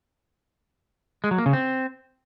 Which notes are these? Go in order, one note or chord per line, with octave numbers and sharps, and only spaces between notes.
G#3
F#3
A#3
C#3
C4